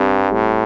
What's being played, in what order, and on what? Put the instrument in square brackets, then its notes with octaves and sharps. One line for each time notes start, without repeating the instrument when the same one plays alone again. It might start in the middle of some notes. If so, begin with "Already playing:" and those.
Already playing: [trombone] G2 [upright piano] G3 C4
[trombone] A2